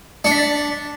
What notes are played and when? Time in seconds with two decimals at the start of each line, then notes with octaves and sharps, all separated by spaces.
0.25 D4 C#7
0.31 B6
0.39 A6